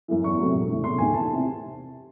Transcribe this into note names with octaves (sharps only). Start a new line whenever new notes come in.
F#2 E3
E2 C#6
C3 F#3 A3
E1
E2 C#3 E3 A3
E1 C6
D#2 D#3 A3 G#5
E2 A5
C3 E3